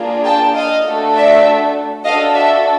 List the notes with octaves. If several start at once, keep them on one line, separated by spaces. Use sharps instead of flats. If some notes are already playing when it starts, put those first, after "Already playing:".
Already playing: A#3 D4 F4 G#4
G5 A5
D#5 F5
A3 D4 F#4 A4
D5 E5
D4 F#4 A4 D#5 F5
D5 E5